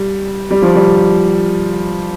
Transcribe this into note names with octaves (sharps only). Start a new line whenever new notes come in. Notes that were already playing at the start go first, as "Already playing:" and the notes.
Already playing: G3
G3
F3
G3